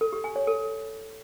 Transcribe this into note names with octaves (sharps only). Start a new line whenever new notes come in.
A4
G4
G#5
C#5
A4